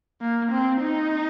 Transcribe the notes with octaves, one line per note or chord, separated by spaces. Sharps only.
A#3
C4
D#4